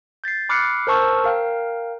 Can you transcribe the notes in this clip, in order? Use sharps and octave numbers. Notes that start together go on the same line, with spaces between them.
G6 A6 B6 C7
B5 D6 F6 F#6 C7 C#7
A#4 C5 A5 C#6 E6 F6
A#4 F5 G5